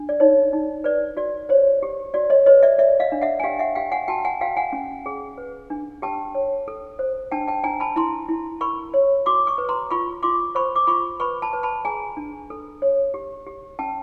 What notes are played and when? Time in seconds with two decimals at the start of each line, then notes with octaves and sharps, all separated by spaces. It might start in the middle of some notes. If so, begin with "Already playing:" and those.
Already playing: D4
0.09 D5
0.20 D#4 C#5
0.53 D#4
0.84 B4 D5
1.17 F#4 D5
1.49 C5 C#5
1.83 G4
2.14 F#4 D5
2.30 C#5 D#5
2.46 B4 C#5 D#5
2.63 D5 E5
2.78 C#5 D5 E5
3.00 D#5 F5
3.12 D4
3.22 E5 F#5
3.40 G#5
3.43 G4 F5 G5
3.59 E5 F#5
3.75 G4 F5 G5
3.92 F#5 G#5
4.08 F#4 G5 A5
4.25 F#5 G#5
4.41 F#4 F5 G5
4.57 F#5 G#5
4.73 C#4
5.06 G#4
5.38 B4
5.70 D4
6.02 G4 G5 A5
6.35 C#5
6.68 A4
6.99 C5
7.32 D4 G5 A5
7.48 G5 A5
7.64 D4 G#5 A#5
7.80 A5 B5
7.96 E4 A#5 C6
8.29 E4
8.61 A#4 B5 C#6
8.94 C#5
9.26 F#4 C6 D6
9.47 C#6 D#6
9.58 B4
9.69 A#5 C6
9.91 F4 B5 C#6
10.23 F4 C6 D6
10.55 C5 B5 C#6
10.76 D6
10.87 F4 B5 C#6
11.20 B4 B5 C#6
11.42 A5 B5
11.53 B4
11.63 A5 B5
11.85 G#4 G#5 A#5
12.17 D4
12.50 A4
12.82 C#5
13.14 G4
13.47 G4
13.79 C#4 G5 A5